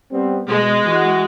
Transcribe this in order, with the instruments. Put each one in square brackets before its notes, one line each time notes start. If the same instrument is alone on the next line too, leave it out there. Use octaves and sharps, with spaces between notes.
[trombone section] G3 B3 C4
[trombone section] B2 [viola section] G#3
[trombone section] E3 F#4